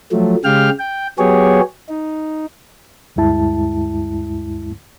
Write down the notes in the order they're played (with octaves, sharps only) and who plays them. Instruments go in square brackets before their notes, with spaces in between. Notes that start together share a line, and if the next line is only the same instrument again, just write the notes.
[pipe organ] F3 F#3 A3
C#3 G#3 G4 F5 G5 F6
G5
F#3 B3 G4 G#4 C#5
D#4
[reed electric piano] D2 G2 G#3 E4 A5